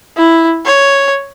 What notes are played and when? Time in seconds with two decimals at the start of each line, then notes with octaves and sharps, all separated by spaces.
0.17 E4
0.66 C#5